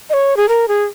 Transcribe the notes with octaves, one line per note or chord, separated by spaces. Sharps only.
D#5
C#5
G#4
A#4
G#4